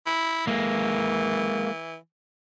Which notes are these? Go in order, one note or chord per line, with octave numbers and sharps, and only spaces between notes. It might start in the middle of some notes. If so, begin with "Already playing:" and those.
E4
E3 G#3 A#3